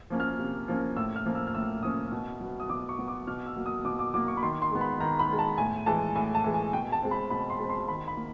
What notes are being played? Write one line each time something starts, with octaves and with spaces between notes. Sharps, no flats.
F3 A#3 C#4
F6
C3
F3 A#3 C#4
A2 E6
F6
F3 A#3 C#4
E6
F6
A2 E6
F3 A#3 C#4 D#6
B2
F#3 B3
D#6
B2 D6
C#6
F#3 B3
D6
B2 F6
E6
F#3 A#3
D#6
B2 D6
D6
F#3 A#3 D6
C#6
B5
D#3 C6
C6
G#3 B3
B5
D#3 A#5
B5
G#3 B3
A5
A2 G#5
E3 G#3 A5
A2 G#5
A5
E3 G#3
G#5
B2 G5
A5
G#3 C4
B5
B2 B5
C6
G#3 C4
C6
D#3 B5
B5
A#3